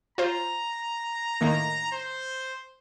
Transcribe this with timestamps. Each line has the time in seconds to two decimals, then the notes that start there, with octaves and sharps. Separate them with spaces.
0.18 F4 C5 A#5
1.41 A2 D#3 A#3
1.92 C5